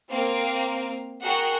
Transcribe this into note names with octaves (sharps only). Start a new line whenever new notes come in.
A#3 C4 A#4 F5 D7
F#4 G#4 A#4 F#5 G5